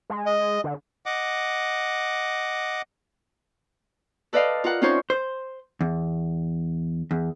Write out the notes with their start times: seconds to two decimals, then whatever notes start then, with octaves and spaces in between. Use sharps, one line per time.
0.10 G#3
0.26 D#5
0.64 D3
1.06 D#5 F#5 D6
4.33 A4 B4 D5 D#5 F5
4.64 F4 A#4 F#5
4.81 C4 C#4 D#4 F4 C5 C#5
5.10 C5
5.81 E2
7.11 E2